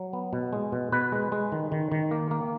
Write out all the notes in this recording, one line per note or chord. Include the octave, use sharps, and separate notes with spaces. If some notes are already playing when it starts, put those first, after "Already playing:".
Already playing: F#3
B3
B2
G#3
B2
B2 B4
G#3
G#3
D#3
D#3
D#3
A#3
A#3